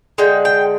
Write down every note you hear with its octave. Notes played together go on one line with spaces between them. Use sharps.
D3 G#3 G5
G5